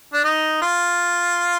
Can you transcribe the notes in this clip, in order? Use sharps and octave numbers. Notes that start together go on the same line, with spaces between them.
D4
D#4
F4